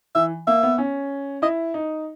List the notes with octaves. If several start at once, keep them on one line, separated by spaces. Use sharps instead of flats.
E3 E5
A#3 E5
B3
C#4
E4 D#5
D#4